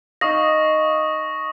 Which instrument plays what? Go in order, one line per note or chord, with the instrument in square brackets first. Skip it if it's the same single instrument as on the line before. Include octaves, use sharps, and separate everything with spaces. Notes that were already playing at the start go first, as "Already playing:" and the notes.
[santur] D#4 F5 [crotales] C#6 D#6 A#6